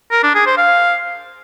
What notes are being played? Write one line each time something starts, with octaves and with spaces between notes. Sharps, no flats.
A#4
D4
G#4
C5
F5